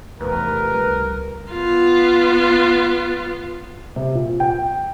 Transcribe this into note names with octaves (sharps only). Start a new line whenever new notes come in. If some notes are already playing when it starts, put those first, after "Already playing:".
F1 E2 E3 A#4 B4
C#2 G3
B3 F4
C3
A#2
G5